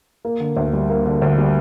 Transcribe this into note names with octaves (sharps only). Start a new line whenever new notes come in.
A#3
D3
D2
G3
A#3
D3
D2
G3